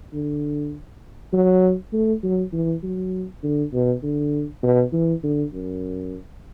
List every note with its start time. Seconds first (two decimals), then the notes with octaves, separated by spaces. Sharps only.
0.13 D3
1.33 F#3
1.93 A3
2.23 F#3
2.53 E3
2.83 F#3
3.43 D3
3.73 B2
4.03 D3
4.63 B2
4.93 E3
5.23 D3
5.53 F#2